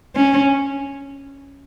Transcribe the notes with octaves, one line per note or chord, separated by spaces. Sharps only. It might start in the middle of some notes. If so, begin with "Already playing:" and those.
C#4